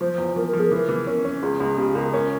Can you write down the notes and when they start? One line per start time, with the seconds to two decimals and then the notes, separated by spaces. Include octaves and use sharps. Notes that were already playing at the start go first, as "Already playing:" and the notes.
0.01 F3 C5
0.18 E2
0.36 F3 A#4
0.48 A#4
0.53 F3
0.60 G#4
0.71 E3 A#4
0.88 E3
1.07 C#4
1.25 C#4
1.42 C#2 G#4
1.60 C#2
1.77 C#3 G4
1.95 C#2 A#4
2.13 C#4 A#4